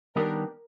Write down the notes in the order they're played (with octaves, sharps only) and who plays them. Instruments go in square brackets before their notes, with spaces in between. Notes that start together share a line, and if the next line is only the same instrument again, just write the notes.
[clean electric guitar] D#3 G3 B3 D4 G4 [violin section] A#4